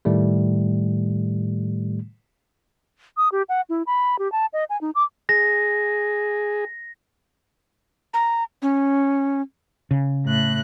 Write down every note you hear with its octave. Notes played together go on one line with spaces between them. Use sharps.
A2 D#3 G3 A3
D#6
G4
F#5
E4
B5
G4
A5
D#5
G#5
D#4
D6
G#4 A#6
A#5
C#4
C#3
A2 F#6